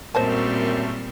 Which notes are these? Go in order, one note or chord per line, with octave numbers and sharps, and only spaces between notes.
F#2 A#2 G3 A3 C4 C5 D#5 A5